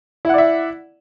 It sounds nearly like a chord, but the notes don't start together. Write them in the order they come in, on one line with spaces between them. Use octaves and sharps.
E4 F#5 D5 E5